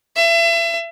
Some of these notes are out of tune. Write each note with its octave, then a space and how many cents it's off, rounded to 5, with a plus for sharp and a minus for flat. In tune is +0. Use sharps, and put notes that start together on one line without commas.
E5 +35